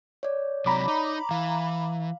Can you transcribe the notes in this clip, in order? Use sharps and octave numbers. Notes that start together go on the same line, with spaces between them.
C#5 D5
C3 F#3 A#5 B5 D6
D#4
E3 F5